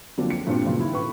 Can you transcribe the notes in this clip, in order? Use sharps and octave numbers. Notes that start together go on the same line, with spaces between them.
D3 F3 F#3 A#3 C4 D4
C#7
G2 A#2 B3 C4 D4
A#2 C#3 F#3
D#3 E4
A2 B4 C#6